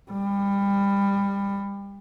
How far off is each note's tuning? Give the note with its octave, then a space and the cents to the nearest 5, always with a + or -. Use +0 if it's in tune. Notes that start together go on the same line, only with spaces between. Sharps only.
G3 +25